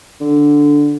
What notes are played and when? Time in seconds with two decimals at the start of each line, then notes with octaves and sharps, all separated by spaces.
0.21 D3